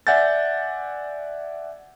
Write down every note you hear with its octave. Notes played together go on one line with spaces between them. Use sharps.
D5 E5 F#5 G#5 G6 A6